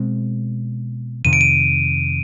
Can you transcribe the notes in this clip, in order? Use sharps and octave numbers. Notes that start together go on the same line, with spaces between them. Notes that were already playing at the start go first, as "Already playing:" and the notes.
Already playing: B2 G#3 C4
F2 C3 D#3 D#7
D7
D#7